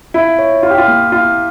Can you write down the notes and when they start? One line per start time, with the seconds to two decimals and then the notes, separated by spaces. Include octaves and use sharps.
0.14 E4 F4
0.39 C#5
0.63 E4 F4
0.71 G4
0.78 F4
0.88 A#3
1.12 E4 F4